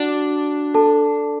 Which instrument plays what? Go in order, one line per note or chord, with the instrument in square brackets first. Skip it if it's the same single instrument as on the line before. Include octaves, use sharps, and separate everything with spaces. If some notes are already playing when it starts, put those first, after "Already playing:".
Already playing: [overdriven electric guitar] D4 [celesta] F#4 F#5
[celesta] A4 A5